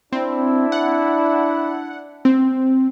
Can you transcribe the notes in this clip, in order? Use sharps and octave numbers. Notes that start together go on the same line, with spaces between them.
C4 D4 E4
F#5
C4